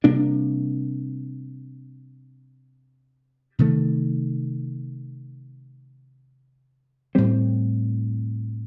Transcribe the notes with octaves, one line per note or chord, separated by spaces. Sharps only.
C3 G3 A#3 D4
C3 D#3 A3
A2 G3 C4